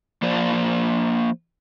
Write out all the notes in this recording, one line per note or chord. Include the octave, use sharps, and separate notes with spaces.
F3 A#3 C5 D5